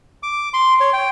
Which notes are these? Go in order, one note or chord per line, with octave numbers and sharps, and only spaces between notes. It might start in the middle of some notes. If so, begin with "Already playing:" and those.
D6
C6
C#5
G5